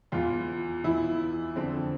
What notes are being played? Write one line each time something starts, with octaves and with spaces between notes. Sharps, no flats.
E2 E3 F4
E2 E3 E4
F2 D3 C4